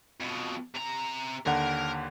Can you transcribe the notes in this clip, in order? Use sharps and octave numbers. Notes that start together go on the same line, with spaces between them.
F2 B2
C3 A#5
D#2 D3 A#4 F#5